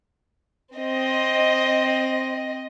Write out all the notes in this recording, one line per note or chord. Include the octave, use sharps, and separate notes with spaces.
C4 D#5